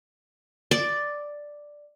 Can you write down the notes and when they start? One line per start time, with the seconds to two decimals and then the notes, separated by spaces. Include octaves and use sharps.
0.71 D5